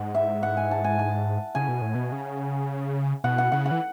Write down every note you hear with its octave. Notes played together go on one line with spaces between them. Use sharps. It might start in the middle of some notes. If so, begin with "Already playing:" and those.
Already playing: G#2 F#5
E5
F#5
G#5
A5
G#5
A5
C#3 G#5
B2
A2
B2
C#3
B2 F#5
F#5
C#3 F#5
F#5
E3